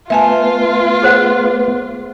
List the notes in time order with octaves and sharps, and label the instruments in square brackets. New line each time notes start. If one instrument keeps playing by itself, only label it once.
[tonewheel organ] A3 B3 B4 [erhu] F4 [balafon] E5 G#5 A5
[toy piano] G#4 C5 F#5